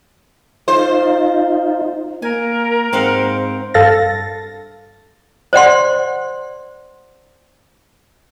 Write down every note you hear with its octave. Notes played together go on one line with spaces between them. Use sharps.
D#4 F4 C5
A#3 A#4 G#5
G#2 C4 F5 F#5
G2 A4 F5 A6 A#6
C5 D5 F#5 C6